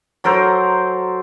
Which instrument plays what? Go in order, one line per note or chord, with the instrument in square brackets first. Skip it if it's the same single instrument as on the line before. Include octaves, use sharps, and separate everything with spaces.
[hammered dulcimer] F#3 A4 A#4 C5